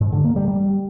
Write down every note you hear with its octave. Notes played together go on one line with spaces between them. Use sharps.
G#2
D3
A#3
G3
G3